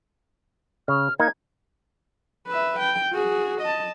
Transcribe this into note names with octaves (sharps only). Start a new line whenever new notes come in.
C#3 F6
A#3 D#4 G#6
B4 E5
G5
F#4 G#4
D#5 A5